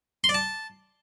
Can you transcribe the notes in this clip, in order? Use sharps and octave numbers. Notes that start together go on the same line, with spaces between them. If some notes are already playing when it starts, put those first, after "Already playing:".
C6
D5
A5